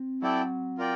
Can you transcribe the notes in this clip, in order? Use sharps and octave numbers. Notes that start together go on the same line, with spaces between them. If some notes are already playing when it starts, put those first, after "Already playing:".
Already playing: C4
F#3 E4 A4 D5 G5
F4 A#4 D5 G5